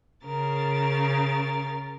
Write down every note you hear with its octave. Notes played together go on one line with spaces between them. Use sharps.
C#3 A#4 A6